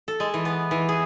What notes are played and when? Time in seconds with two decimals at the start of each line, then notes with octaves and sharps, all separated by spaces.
0.08 A4
0.20 G#3
0.34 E3
0.45 B3
0.71 E3
0.89 G#4